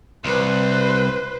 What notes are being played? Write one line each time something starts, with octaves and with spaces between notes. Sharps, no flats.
C2 B4 C5